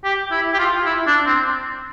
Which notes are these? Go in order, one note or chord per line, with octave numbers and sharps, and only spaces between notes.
G4
E4
G4
F4
E4
D4
C4